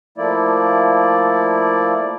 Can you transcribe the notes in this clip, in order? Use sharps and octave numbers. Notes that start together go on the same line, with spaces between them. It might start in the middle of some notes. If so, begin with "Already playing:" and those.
F3 A3 A#3 E4 D5